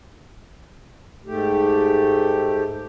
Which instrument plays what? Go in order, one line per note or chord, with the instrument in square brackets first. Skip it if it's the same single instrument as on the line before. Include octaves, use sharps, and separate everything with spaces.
[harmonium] G#2 A3 G4